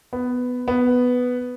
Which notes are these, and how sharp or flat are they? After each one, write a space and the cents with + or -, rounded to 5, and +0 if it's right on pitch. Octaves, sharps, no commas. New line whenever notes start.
B3 +10
B3 +5